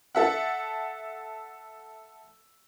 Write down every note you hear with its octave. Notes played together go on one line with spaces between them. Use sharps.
A4 E5 F#5